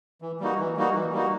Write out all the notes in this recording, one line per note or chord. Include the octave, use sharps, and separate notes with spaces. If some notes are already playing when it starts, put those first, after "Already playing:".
E3
G3 A#3 D#4 F#4
E3
G3 A#3 D#4 F#4
E3
G3 A#3 D#4 F#4